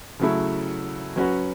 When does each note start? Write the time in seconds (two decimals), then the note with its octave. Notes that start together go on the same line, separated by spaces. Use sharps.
0.19 C#3 F#3 A3 E4
1.16 F#3 C#4 F#4 B4